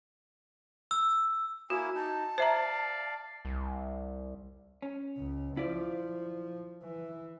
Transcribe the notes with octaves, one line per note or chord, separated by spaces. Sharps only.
E6
A#3 E4 F#4 G#5
D#4 A5
C5 D5 E5 F5 A#5
C2
C#4
C#2
F3 E4 F4 D5
E3